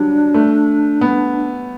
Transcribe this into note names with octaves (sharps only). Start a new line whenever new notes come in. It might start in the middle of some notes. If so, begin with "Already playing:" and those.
Already playing: D3 F#3 G3 D4
A3
B3